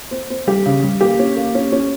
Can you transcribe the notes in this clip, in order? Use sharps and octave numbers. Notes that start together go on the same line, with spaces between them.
C4
C4
G3 G4
C#3
G3
A#3 G4
C#4
A#3
C#4
C#4